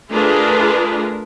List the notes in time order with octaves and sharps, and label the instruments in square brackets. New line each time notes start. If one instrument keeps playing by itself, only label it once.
[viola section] A3 D4 F4 G#4 A#4 B4